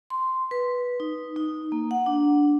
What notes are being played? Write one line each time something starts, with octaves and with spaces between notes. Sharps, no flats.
C6
B4
D#4
D#4
A#3
F#5
D4